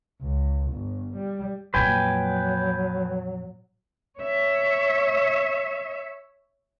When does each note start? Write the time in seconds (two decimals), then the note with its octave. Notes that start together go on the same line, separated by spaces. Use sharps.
0.22 C#2
0.72 G1
1.16 G3
1.74 F2 A#2 F#3 B4 G5 G#5
4.19 C#5 E5